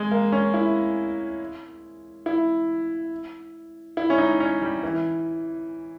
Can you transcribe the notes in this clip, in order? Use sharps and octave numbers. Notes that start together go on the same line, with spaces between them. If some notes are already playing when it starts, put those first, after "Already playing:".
Already playing: G#3
A#3
C#4
E4
E4
E4
C#4
D#4
C#4
G3
E3